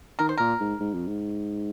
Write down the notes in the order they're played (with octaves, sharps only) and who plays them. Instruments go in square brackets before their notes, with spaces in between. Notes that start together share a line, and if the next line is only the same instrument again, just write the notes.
[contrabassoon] D#3 [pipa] A#4
[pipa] C5
[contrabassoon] A#2 [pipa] A#4
[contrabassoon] G#2
G#2
F2
G#2